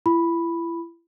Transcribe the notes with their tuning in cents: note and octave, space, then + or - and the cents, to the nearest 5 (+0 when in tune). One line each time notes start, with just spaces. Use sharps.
E4 +35 B5 +0